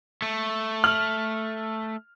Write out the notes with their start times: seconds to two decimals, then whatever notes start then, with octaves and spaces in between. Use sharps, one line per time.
0.22 A3
0.84 F6 F#7